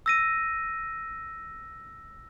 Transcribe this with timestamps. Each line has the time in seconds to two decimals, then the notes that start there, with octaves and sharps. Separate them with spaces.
0.06 E6 A#6 D#7